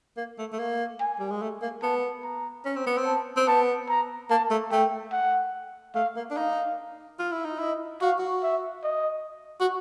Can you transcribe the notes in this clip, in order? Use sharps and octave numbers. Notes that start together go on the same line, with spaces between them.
A#3
A3
A3
A#3
G#5
G3
G#3
A3
A#3
B3 A5
A#5
C#4
C4
B3
C4
A5
C4
B3 A5
A#5
A#3 A5
A3
A3 G5
F#5
A3 F5
A#3
D4
D#4 F5
F4
E4
D#4
E4 D#5
F#4 F5
F#4
E5
D#5
F#4